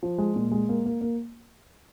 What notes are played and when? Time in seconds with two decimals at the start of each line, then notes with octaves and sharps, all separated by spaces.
0.03 F3
0.18 G#3
0.36 A#2
0.51 G#3
0.69 A#3
0.86 A#3
1.01 A#3